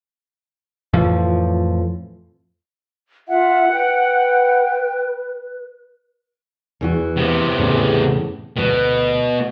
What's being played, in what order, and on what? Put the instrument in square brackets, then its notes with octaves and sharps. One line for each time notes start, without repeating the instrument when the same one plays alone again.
[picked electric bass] F2 A2 E3 F3
[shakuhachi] F4 [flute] E5 [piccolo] F#5
[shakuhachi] B4 [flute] G5
[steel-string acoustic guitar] E2 E3 F#4
[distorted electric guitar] C3 B3
[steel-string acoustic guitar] E2 A2 C#3
[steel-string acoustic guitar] D2 B3 [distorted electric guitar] B2